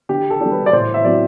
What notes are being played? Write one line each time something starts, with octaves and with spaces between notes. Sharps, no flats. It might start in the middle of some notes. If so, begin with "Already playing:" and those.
D3 G4
A4
G3 D4
B4
D5
A2 C5
E5
F#3 C4 E4 D5